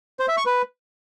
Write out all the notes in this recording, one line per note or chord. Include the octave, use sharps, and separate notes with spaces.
C5
E5
C#6
B4